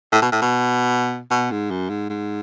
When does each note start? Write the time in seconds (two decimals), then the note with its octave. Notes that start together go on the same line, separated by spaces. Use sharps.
0.12 A2
0.22 B2
0.32 A2
0.41 B2
1.31 B2
1.51 G#2
1.71 F#2
1.89 G#2
2.10 G#2